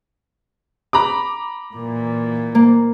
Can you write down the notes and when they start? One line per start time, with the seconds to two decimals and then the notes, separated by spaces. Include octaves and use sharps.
0.93 A#5 B5 D6
1.74 A#2 E3
2.55 A#3